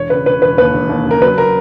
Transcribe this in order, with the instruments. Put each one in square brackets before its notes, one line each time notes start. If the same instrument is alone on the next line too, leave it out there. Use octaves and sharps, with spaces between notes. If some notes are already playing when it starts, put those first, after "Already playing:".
Already playing: [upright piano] E1 C#5
C#3 B4
E1 B4
E1 B4
D#2 B4
E1
D#2
C#3 A#4
F#3 B4
F#3 A#4